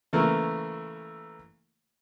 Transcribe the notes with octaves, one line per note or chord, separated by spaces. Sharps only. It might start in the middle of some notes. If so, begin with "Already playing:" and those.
C#3 E3 A3 A#3 E4 A#4